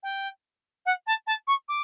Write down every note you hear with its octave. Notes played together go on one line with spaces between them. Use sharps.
G5
F#5
A5
A5
C#6
D6